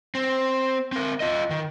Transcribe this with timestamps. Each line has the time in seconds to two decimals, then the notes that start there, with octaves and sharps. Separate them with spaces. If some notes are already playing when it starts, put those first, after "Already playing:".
0.15 C4
0.92 C4 A#4
1.20 F4 D#5
1.50 D#3